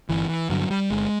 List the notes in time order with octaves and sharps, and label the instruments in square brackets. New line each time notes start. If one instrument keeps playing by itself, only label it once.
[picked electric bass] G1 E3
E3
G2 D3 F#3
G3
G1 G#3